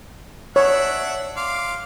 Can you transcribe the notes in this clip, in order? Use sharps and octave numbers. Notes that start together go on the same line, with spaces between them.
D4 C#5 E5 F#5
F5 C6 D6